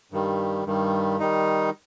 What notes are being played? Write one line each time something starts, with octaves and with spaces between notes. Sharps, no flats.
G2 D#3 G3
G2 D#3 G3
D#3 G3 D#4